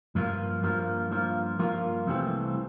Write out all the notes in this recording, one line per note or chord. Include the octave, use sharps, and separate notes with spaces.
G2 F3 A#3 F4
G2 F3 A#3 F4
G2 F3 A#3 F4
G2 F3 A#3 F4
C2 C3 E3 A3 C4